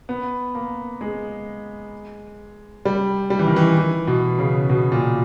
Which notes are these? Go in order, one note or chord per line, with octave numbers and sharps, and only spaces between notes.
B3
A#3
G#3
G3
G3
E3
D#3
E3
E3
B2
C#3
B2
A#2